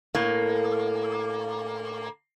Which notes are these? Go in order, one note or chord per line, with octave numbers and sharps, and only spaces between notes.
A2 A#3